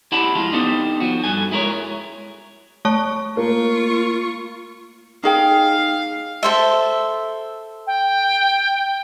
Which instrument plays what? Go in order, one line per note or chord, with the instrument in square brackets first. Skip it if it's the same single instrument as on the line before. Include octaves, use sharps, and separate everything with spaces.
[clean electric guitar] E4 G4 F#5 A5 B5
F2 G#3 F4
B3 D4 D#4 G4 A4 C5
F3 F#4
G2 F#4 A4 G#5
G#3 E4 A#4 B4 C#5
[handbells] A3 C#5 A5 [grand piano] C#6
[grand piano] A#3 [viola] F4 C#6
[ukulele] D#4 G#4 G5 [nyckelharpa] F5
[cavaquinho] A4 C5 E5
[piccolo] G5